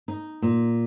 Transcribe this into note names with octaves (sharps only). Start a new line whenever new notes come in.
D#4
A#2